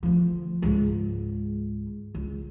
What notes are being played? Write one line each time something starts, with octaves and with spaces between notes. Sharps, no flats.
D2 F3
C#2 G#2
C#2